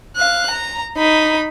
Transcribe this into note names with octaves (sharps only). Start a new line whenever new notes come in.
F5 F#6
A#5
D#4 B5